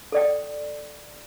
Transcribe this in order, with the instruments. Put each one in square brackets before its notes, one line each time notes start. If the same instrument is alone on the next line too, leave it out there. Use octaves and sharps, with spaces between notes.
[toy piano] A4 D5 G5